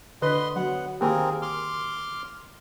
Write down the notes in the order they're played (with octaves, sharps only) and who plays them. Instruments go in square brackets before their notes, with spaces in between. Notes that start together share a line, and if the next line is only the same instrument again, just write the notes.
[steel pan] D3 B4 [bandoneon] D#5 C6
[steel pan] F#3 [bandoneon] B3 F#5
[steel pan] D#3 A#3 G4 [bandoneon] C4 G#4 A#4
[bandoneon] C6 D6 F6